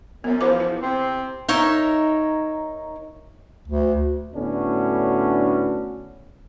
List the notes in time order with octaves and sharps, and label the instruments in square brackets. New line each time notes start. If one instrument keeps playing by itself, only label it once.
[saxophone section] F#2 [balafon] B3
[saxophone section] E2 F3 [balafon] C5 D6
[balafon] E4
[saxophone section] C3 C4
[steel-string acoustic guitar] D#4 A#4 C#5 E5
[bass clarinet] D2
[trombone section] A2 D3 B3 C#4 D4 F#4